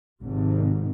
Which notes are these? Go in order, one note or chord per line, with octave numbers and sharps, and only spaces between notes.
G#1 G#2 C3